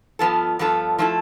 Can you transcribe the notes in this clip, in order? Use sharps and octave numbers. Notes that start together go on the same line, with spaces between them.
G2 F3 B3 F4 A4
G2 F3 B3 F4 A4
F3 A3 E4 A4